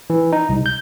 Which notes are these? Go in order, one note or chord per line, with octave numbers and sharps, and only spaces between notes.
E3
D#4
C2
G6